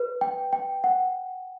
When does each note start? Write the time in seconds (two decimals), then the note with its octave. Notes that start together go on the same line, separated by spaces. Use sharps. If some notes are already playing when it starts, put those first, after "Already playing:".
Already playing: B4
0.21 G5
0.53 G5
0.84 F#5